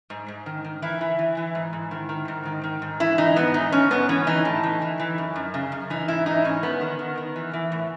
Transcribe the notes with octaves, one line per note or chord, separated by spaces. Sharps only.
G#2
G#2
D#3
D#3
E3 E4
E3
E3
E3
G#2
G#2
D#3
D#3
G#2
D#3
D#3
G#2
E3 E4
E3 D#4
G#2 B3
E3 D#4
G#2 C#4
G#2 B3
E3 C#4
E3 D#4
A2
E3
E3
E3
F#2
F#2
C#3
F#2
E3 D#4
G#2 E4
E3 D#4
G#2 C#4
E2 B3
D#3
D#3
D#3
E3
E3
A2